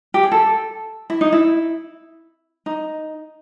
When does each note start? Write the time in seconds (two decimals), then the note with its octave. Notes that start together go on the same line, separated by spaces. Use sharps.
0.14 G4
0.23 G#4
0.32 A4
1.10 E4
1.21 D#4
1.32 E4
2.66 D#4